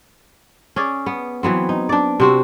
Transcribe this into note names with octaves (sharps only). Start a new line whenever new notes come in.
C#4 G#4 D5
B3
E3 F#3 B3 C4
D#4
D4 D5
C3 C4 F#4